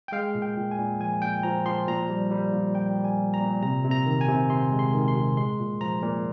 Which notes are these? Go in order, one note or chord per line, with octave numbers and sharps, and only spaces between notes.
G5
G#3 F5
A#2
G5
A#2
G#5
A#2
F3 G#5
A#2 G5
F3 A#5
F3 C6
A#2 A#5
G3
G3
A#2
A#2 G5
G3
G#5
A#2
A#5
A#2
C3 A#5
C3
A#5
D#3
G#5
C3
C3 C6
G#3
C6
D#3
C6
C3
G#3 C6
A#2
F3 A#5
A#2